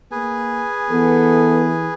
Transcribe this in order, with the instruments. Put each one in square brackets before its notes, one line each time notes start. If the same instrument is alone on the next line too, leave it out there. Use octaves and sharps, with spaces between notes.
[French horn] A#3 [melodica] G#4 B4 G#5
[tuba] E3 [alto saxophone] B3 [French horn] A4